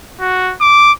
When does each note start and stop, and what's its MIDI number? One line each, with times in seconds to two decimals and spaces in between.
0.20 0.54 66
0.60 0.92 86